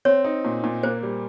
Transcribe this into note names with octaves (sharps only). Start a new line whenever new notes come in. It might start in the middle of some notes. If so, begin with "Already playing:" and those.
C4 C#5
D#4
A#2
A#2
A#3 C5
G3